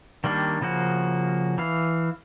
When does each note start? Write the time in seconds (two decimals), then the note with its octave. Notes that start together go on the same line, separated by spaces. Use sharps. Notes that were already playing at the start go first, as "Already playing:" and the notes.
0.24 D#3 G3 A#3 D4
0.61 C#3 F3 A#3 F#4
1.58 E3 F5